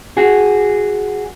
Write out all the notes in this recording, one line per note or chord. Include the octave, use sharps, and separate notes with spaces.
F#4 G#4